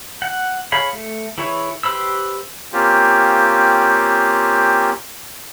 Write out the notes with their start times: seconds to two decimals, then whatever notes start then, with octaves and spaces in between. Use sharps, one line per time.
0.22 F#5
0.72 G#4 C#5 F5 B5
0.93 A3
1.38 E3 E4 G#4 C#5
1.83 G4 B4 C5 B5 E6
2.72 A#3 C4 C#4 F4 G4